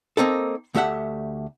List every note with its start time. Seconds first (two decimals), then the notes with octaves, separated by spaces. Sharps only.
0.17 A#3 C4 D#4 A4
0.75 D2 A3 G4 E5 F#5